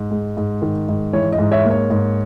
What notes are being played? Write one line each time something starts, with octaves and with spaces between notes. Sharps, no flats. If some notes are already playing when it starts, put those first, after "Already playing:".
Already playing: G#2
G#3
G#2
D#3
G#2
E3 C#5
D#5
G#2
C#5 E5
A#3
C#5
G#2